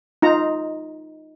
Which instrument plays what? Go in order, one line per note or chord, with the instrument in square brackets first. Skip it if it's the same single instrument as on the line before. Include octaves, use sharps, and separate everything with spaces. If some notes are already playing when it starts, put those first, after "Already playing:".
[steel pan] D#4 F4 A#5